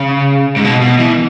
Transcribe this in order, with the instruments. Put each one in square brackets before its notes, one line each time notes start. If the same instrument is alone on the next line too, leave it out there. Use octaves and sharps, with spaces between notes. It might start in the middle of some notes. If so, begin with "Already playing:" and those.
Already playing: [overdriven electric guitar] C#3
G#2
B2
B2
E3